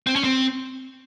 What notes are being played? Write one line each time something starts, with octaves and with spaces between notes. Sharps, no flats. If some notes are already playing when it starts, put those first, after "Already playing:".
C4
C#4
C4